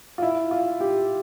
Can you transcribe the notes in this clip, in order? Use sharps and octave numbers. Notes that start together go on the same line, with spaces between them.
F4
E4
F4
G4